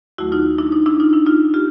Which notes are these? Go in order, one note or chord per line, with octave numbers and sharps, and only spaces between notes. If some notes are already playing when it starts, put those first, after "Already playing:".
D#2 D#3 F#3 A3 E4 F#4
D#4 F4
D4 E4
D#4
D4 E4
D#4 F4
D4 E4
D#4 F4
F4 G4